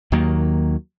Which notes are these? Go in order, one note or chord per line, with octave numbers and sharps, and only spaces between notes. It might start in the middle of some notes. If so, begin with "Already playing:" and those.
D#2 D#3 F#3 A#3